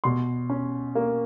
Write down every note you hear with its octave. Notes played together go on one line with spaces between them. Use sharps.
B2 C6
C#4
A#3